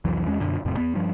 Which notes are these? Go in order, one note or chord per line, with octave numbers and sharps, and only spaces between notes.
C2 F2 E3 F#3
E2 G#3 C#4
F#2 B2 D3
E1 F2 A2 C3
E2 B3
G2 F3